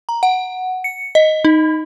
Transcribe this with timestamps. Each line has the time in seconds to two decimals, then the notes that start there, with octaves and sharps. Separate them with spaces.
0.09 A#5
0.23 F#5
0.84 C#7
1.15 D#5
1.45 D#4